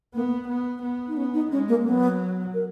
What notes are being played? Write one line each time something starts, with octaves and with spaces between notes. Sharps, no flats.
A#3 B3
B3
B3
D#4
B3 C#4
D#4
G#3 C#4
A#3
F#3 B3
A#4